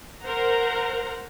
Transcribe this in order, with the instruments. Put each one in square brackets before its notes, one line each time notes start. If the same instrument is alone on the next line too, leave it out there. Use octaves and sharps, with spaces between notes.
[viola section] A#4 C5 F#5 A#5